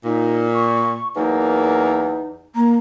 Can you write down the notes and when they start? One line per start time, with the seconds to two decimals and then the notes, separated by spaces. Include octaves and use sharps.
0.05 A#2 D#4
0.54 C#6
1.16 E2 F#3 A#3 D#4
2.56 A#3 A#5